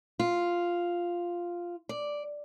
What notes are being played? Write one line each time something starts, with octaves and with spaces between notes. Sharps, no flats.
F4
D5